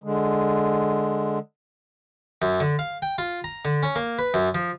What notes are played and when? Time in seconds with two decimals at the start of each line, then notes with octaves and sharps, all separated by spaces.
0.04 D3 G#3
2.42 F#2
2.60 D3
2.79 F5
3.02 G5
3.18 F4
3.44 A#5
3.65 D3
3.83 C#4
3.96 A#3
4.19 B4
4.34 F#2
4.55 F3